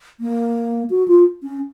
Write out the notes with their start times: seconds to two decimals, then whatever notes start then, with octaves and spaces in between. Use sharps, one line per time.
0.20 A#3
0.90 F#4
1.08 F4
1.43 C#4